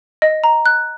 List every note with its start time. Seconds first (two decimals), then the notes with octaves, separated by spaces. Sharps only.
0.22 D#5
0.44 A#5
0.66 F#6